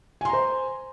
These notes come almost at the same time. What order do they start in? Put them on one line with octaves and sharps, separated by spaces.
G#5 C6 A#5 C5